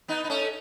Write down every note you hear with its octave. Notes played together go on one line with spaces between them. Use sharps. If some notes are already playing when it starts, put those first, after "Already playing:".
B3 D#4
D#4
A3 C#4